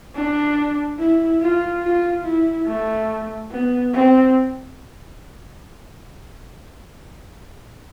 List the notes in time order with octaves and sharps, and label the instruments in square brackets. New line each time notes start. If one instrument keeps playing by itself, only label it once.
[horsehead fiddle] D4
E4
F4
F4
E4
A3
B3
C4